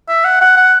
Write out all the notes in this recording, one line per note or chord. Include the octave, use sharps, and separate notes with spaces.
E5
F#5
F#5
F#5